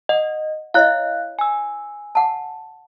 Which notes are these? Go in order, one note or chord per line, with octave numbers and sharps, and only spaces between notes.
D#5 F#5
E4 C#5 D#5 F5 F#6
G#5 E6
F#5 A5